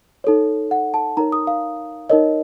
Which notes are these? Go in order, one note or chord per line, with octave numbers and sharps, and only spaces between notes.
D#4 A4 C#5
F#5
A5
D#4 A#4 C#5 A#5
D#6
F5
D#4 A#4 C#5 D#5